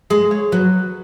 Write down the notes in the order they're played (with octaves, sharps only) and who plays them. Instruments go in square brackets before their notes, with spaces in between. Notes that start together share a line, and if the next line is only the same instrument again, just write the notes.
[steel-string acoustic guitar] G#3 [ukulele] G#4
[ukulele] C#5
[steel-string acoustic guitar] F#3 [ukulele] B4